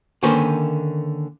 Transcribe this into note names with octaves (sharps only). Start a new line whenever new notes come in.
D3 D#3 A#3 C#4 B4 C5